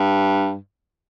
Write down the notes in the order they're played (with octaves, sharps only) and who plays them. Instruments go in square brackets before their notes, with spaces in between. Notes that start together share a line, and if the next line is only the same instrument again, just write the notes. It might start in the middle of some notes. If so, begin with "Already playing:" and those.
Already playing: [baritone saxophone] G2